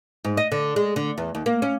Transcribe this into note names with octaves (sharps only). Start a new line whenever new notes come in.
G#2
D#5
D3
G#3
D3
E2
D#2
A#3
C#4